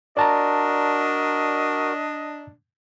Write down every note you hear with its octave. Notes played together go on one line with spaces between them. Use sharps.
D4 F#4 A#4 D5 D#5 A5 A#5